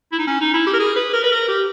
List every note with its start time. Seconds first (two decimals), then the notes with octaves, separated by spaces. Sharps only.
0.12 E4
0.19 D#4
0.27 C#4
0.41 D#4
0.54 E4
0.66 G4
0.73 A#4
0.79 G#4
0.96 B4
1.13 A#4
1.24 B4
1.32 A#4
1.48 G4